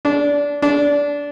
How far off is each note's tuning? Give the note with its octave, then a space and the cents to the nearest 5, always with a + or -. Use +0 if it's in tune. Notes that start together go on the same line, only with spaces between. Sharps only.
D4 -20
D4 -20